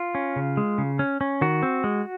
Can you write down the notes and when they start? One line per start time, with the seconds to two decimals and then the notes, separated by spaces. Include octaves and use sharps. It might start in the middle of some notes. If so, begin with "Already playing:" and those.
Already playing: F4
0.15 C#4
0.36 C#3
0.57 G#3
0.78 C#3
0.99 C#4
1.21 C#4
1.41 D#3 F#4
1.62 C4
1.84 G#3